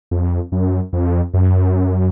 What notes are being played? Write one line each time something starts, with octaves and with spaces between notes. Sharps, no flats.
F2
F#2
F2
F#2